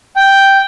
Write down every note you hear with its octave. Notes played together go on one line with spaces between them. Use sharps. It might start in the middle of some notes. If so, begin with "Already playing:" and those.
G5